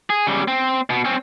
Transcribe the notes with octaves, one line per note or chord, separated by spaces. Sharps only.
G#4
C#3 G3
C4
B2
C4 C#4